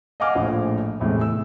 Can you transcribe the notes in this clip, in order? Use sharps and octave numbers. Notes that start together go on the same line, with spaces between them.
D#5 F5 F#5 G#5 D6 F6
A#1 A2 F3
E2 A2 C3 G#3
E6